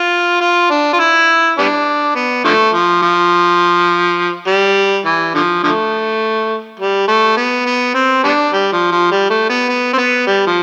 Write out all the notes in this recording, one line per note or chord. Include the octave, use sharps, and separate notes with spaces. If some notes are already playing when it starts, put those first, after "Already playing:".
Already playing: F4
F4
D4
F4
E4
G3 B3 D4
B3
D3 F3 A3
F3
F3
G3
E3
D3 F3
D3 F3 A3
G3
A3
B3
B3
C4
G3 B3 D4
G3
F3
F3
G3
A3
B3
B3
C4
B3
G3
F3